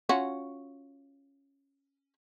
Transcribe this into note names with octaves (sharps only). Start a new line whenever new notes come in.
C#4 F4 F#4